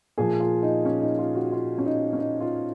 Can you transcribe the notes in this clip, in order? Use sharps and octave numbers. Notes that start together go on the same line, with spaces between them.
A#2 F3 G#4
F4
D#4
C#4
D#4
F4
F#4
F4
C#4
D#4
C#4
D#4
F4